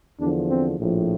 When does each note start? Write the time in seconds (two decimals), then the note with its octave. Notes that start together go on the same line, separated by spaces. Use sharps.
0.20 E2 D3 F3 D4
0.49 C4
0.79 A#1 A2 F3